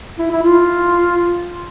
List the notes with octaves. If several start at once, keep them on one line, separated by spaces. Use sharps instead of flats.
E4
E4
F4